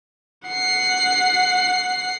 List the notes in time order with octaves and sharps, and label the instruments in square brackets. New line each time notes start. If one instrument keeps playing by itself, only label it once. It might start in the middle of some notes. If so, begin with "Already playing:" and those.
[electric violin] F#5 C7